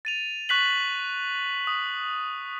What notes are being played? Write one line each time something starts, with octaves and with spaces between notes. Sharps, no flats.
A6 D#7 F7
C#6 F#6 B6 F#7
D#6